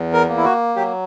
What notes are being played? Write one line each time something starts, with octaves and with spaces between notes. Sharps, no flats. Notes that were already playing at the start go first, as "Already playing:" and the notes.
Already playing: E2
A#4
A#3
E4
F#4
F#3 G4